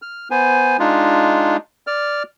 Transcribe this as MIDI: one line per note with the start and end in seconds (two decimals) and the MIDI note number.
0.02 0.28 89
0.31 0.77 59
0.31 0.77 72
0.31 0.77 80
0.79 1.57 56
0.79 1.57 62
0.79 1.57 63
0.79 1.57 65
1.87 2.23 74
1.87 2.23 89